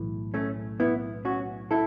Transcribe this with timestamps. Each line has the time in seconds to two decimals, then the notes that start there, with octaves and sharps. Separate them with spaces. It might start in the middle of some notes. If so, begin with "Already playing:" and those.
Already playing: B1 A2 E3
0.34 A3 C#4
0.80 B3 E4
1.25 C#4 F#4
1.71 E4 A4